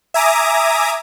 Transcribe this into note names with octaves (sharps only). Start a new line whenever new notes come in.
E5 G#5 A#5 D6 D#6